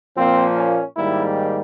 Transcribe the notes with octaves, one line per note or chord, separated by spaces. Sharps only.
A#2 F3 A#3 C4
C#4
G#2 D#3 G3 A#3 E4